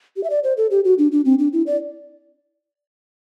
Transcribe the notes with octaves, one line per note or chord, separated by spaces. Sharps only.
G4
E5
D5
C5
A4
G4
F#4
D4
D4
C4
D4
E4
D5